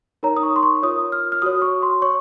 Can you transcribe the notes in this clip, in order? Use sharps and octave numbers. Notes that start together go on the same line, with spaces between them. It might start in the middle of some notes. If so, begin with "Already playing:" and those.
D#4 A#4 C#5 A#5
D#6
C#6
C6
C#6
F4 A#4 C#5 D#6
F6
F6
F#4 C#5 D#6
C#6
C6
C#5 C#6